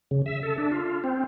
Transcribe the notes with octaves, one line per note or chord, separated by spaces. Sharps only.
C#3
E5
A4
D4
F4
C4